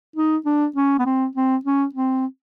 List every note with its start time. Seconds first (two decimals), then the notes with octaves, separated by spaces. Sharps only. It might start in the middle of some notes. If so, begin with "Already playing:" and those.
0.16 D#4
0.45 D4
0.76 C#4
0.99 B3
1.06 C4
1.35 C4
1.65 C#4
1.94 C4